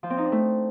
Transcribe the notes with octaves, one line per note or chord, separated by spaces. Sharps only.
F3
C4
D#4
D4
A3